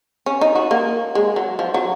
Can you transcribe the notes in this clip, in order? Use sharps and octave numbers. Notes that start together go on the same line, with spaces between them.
C#4
D#4
F#4
A#3
G#3
F#3
F3
F#3